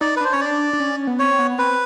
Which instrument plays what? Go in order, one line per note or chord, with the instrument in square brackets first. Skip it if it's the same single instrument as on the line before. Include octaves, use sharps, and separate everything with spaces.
[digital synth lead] D#4 [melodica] D5
[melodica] B4
[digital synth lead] D4 [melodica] C5
[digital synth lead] C#4 [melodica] C#5
[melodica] D5
[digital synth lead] D4
D4
C#4
B3
[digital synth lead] C4 [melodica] C#5
[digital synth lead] B3
[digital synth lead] C4 [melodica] B4